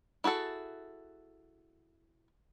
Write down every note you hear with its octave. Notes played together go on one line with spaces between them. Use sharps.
E4 F#4 G#4 A4